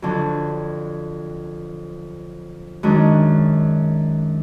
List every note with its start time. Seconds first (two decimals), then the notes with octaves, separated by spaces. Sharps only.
0.02 F2 D3 F#3 D4
2.83 F#2 D#3 G#3 D4